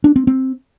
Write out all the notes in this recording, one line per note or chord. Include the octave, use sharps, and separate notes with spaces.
D4
C4
C4